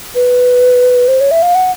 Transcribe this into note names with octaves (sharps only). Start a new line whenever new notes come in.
B4
C5
C#5
E5
F5
F#5